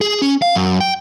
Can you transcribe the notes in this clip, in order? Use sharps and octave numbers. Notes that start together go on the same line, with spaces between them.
G#4
C#4
F5
F#2
G5